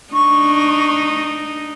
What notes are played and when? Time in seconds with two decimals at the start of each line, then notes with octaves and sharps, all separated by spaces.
0.13 D4 D#4 C#6